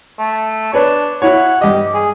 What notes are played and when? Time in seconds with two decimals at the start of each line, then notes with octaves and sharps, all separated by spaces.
0.19 A3
0.73 D4 B4 C#5
1.22 E4 F#4 C#5 F#5
1.61 G2 G4 D#5
1.94 G#4